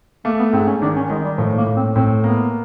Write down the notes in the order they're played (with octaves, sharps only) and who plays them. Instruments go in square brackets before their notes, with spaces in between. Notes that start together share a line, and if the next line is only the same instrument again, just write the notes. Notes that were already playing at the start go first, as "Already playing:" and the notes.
[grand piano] A3 [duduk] A#3
[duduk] B3
[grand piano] G#2 [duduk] C4
[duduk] C#4
[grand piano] D#3 [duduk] D4
[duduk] C#4
[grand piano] D#3 [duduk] G#3
[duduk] G3
[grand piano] A2 [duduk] F3
[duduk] A#3
[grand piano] A2
[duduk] C4
[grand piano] A2 [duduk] C4
[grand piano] A#3 [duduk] B3